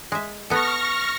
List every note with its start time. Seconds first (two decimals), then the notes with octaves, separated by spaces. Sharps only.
0.12 G#3 E5
0.50 B3 A4 C#6 F6 A#6